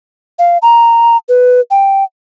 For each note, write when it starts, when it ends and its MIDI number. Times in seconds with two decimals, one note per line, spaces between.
0.39 0.58 77
0.62 1.17 82
1.29 1.60 71
1.71 2.04 79